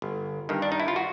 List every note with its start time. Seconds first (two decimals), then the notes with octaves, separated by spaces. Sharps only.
0.02 G1
0.49 G2 D#3
0.62 D4
0.72 D#4
0.80 E4
0.88 F4
0.96 F#4